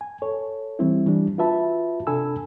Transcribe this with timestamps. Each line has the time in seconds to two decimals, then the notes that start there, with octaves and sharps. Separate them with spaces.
0.01 G#5
0.22 A4 C#5
0.79 E3 G3 C4 E4
1.06 E3 G3 D4
1.38 F4 F#4 B4 E5 A5 B5
2.07 C3 D4 A4 G#5 B5 E6